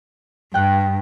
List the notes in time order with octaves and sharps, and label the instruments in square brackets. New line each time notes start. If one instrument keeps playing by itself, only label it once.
[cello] G2 [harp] G5 F#6